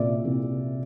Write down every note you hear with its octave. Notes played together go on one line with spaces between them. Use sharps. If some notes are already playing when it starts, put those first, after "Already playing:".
Already playing: C2 A#2 D5 E5
C2